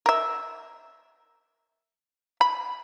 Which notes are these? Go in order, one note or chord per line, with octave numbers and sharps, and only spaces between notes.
A#4 E5
B5